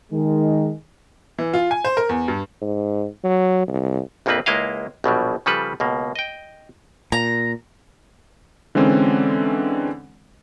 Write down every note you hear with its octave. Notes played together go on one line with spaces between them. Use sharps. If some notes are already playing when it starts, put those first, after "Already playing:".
D#3 G#3
E3
F4
G#5
C5
A#4
E2
G2
G#2
F#3
C2
A#1 F2 F3 A#3 C4 B4
C#2 G#3 A#3 E4 D#5 F5
A#1 B2 F#3 G3
C#3 F3 G3 A4 B4
C#2 B2 A#3
D#5 G5
A#2 A#5
D3 E3 G#3 C4 C#4